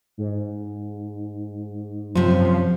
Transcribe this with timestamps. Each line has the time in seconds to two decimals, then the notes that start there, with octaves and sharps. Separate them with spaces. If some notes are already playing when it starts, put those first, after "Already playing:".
0.18 G#2
2.15 F#2 C3 F3 C5